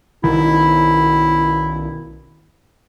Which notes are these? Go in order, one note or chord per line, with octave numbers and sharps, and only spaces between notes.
B1 B2 D#3 E4